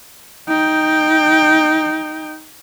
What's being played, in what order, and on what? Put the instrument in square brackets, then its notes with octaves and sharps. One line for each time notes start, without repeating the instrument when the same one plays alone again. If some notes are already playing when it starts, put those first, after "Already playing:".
[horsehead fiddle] D#4 G5